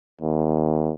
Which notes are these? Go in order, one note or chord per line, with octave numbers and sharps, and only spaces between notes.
D#2